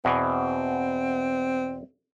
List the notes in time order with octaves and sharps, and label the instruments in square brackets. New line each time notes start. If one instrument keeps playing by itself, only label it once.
[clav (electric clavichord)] E2 B2 E3 [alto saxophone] C4